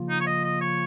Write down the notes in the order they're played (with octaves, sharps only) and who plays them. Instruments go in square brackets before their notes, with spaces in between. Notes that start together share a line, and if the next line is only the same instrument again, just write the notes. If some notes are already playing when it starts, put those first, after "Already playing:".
Already playing: [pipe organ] C#3 F3 A#3 F4
[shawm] D#4
C#5
D#5
D#5
C#5